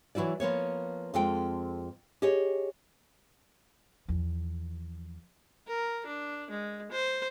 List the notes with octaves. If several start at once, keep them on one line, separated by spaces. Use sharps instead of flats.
E3 F#3 E4 F#4 D5
F3 A#3 B3 C#5
F2 G#3 C4 F4 A4 G5
G4 G#4 C#5 D#5
E2 F3
A#4
D4
G#3
C5